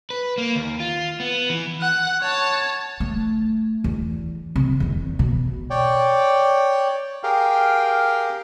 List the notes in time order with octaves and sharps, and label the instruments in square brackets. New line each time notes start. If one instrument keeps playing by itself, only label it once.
[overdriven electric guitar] B4
A#3
D#2
F4
B3
E3
[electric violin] F#5
C#5 A5
[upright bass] A3
E2
C3
E2 D#3
B2
[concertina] C#5 D5 G5
G4 G#4 A#4 F5 G5